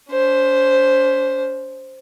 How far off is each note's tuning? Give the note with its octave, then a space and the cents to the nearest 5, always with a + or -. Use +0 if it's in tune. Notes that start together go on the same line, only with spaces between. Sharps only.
C#4 +45 C5 +0